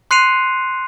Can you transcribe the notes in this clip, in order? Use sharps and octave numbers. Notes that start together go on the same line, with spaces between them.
C6 F#6 C7 C#7 D#7 F7